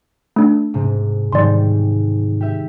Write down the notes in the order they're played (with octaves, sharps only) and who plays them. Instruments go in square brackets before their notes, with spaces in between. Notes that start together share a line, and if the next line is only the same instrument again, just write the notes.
[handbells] A3 D4
[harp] G#2 C3
[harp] G#2 D#3 G3 [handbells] D5 C6
[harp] G4 E5